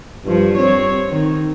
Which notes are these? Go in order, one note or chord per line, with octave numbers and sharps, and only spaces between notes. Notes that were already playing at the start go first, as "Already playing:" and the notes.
G2 F3
C4 C#5
D#3